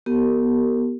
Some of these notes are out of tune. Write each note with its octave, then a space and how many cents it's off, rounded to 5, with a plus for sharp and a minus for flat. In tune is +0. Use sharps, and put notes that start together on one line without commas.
B3 -25 G4 -20 A#4 -30